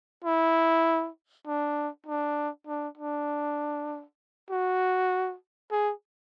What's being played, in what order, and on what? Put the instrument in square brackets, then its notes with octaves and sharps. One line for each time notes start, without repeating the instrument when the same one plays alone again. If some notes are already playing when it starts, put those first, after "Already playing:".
[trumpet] E4
D4
D4
D4
D4
F#4
G#4